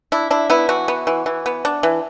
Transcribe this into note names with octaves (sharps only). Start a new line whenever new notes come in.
D4 E4
D4 E4
B3 E4
E3 F#4
B3
E3
E3
B3
D4
E3